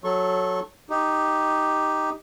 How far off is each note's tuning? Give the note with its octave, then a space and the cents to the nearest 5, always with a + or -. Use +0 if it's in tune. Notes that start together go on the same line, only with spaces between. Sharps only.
F#3 +0 A4 -5 C#6 -30
D#4 +0 G4 +0